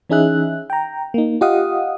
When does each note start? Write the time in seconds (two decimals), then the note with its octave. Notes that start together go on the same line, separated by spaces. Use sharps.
0.10 E3 C#4 D#4 G#4 E5 F#6
0.70 G5 A#5
1.14 A#3 D#4
1.41 F4 G4 D#5 F5 F#5 D#6